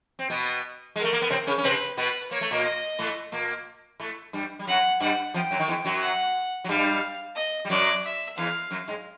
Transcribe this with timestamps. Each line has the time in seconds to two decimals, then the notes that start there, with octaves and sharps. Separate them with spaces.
0.19 C4
0.30 B2 B3
0.96 G#3 A#4
1.04 A3
1.13 A#3
1.22 B3
1.30 C3 C4
1.47 C#3 C#4
1.58 C#4
1.64 C3 C4 B4
1.97 B2 B3 B4
2.31 A#3 C#5
2.41 A3
2.51 A#2 A#3
2.65 D#5
2.99 A2 A3
3.32 A#2 A#3
4.00 A2 A3
4.33 G2 G3
4.59 G3
4.67 F#2 F#3 F#5
5.00 G2 G3 F#5
5.34 F2 F3 G5
5.51 F#2 F#3
5.59 D#3
5.68 E2 E3
5.85 F#2 F#3
6.01 F#5
6.64 F#3
6.69 G2 G3 F5
7.36 D#5
7.65 G3
7.70 F#2 F#3 D5
8.04 E5
8.37 E2 E3 F5
8.71 F#2 F#3
8.88 G#2 G#3